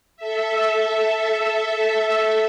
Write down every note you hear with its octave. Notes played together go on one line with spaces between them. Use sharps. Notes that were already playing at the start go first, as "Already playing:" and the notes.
A4 E5